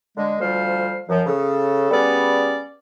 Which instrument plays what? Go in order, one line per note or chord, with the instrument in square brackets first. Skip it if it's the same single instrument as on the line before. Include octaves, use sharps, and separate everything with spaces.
[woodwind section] D3 G#3
D2 F3 G3 C5 F5
F#2 F3
C#3 A4
G3 B3 C#4 G#4 D5